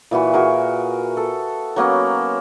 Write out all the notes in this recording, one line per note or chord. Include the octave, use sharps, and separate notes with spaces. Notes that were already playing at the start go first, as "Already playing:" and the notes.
A#2 E3 F#4 B5
F#4 G#4 A#4
A4
F#3 A#3 B3 C#4